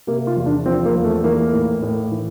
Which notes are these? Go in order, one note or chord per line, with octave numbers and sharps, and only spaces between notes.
C3 A#3
F4
E2
D4
F3 C4
A#3
E2
A3
E3 A#3
A2
A2
E3